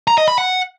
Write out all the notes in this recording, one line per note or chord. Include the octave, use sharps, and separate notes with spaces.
A#5
D#5
B5
F#5